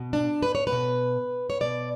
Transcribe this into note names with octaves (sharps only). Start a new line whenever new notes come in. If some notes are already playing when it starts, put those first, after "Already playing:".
Already playing: B2
D4
B4
C#5
B4
B2
C#5
B2 D5